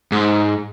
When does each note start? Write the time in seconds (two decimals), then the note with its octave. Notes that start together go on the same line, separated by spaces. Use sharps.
0.12 G#2